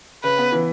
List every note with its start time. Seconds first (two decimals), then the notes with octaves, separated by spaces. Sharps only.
0.24 C#3 B4
0.39 B3
0.52 E3